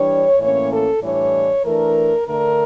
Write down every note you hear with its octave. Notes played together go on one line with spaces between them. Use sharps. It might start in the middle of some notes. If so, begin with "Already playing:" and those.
Already playing: E3 G3 D4 C#5
A2 E3 A#3 C#4 C#5
A4
A2 E3 G3 D4 C#5
E3 A3 D4 A#4
D3 A3 D4 A#4